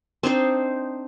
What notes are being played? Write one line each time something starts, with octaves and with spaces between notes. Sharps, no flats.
C4 D4 D#4 C5